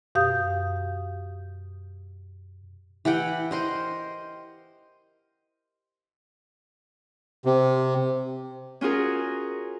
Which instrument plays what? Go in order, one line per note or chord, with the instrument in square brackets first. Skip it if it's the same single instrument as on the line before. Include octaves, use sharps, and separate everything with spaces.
[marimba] F#2 B2 G4 F5 D#6 G6
[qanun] E3 G4 F#5 G5
A#4 C5 D#5
[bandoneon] C3
[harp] C#4 F4 F#4 G#4 A#4